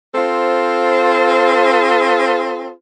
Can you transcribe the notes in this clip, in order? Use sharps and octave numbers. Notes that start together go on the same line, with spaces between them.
C4 F4 A4 C5